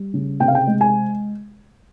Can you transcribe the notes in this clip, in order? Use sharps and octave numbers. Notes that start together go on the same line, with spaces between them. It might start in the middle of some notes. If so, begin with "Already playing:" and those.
Already playing: G3
C#3
C3 G5
F5
G5
G#3
G#5